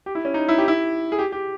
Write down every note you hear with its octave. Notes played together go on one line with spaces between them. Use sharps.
G4
E4
C#4
D#4
E4
G4
E4
G#4
G4
G4